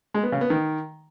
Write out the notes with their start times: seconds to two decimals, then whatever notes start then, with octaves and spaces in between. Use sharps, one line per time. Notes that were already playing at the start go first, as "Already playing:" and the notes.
0.14 G#3
0.23 B3
0.32 C#3
0.41 B3
0.50 D#3